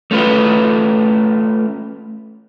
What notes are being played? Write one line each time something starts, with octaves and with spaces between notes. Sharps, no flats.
A3 C#4 F4 B4